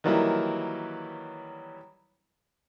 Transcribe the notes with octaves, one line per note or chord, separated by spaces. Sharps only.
D#3 E3 F#3 G3 A#3 E4